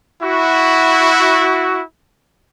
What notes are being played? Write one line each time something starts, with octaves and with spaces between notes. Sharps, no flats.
E4 F#4